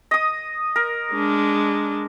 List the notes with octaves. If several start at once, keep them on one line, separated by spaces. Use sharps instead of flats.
D#5 D#6
A#4
G#3 D4